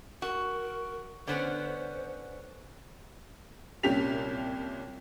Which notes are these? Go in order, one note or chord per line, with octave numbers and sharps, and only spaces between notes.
F#4 A#4
D3 B3 C#4 C5
C2 A#2 C#4 G4 B6 F7